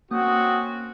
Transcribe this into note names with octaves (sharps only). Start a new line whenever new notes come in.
A#3 C4 C#4 F#4 D#6